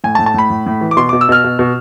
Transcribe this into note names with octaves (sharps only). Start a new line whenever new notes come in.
A2 G#5
A5
A2
A5
A2 B5
A2
A2
E3
D6
B2 C6
B2 D6
E6
B2 F6
B2
B2